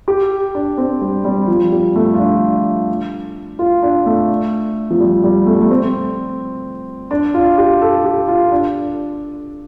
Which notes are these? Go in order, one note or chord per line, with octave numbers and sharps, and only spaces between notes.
G4
D4
C4
G3
G3
F3
G3
A3
F4
D4
F4
D4
A3
F3
G3
G3
A3
G3
A3
C4
D4
F4
G4
A4
G4
F4
D4